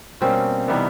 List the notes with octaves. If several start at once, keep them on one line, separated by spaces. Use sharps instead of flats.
B2 G3 A#3 C4 C#4
C3 E3 G3 B3 D#4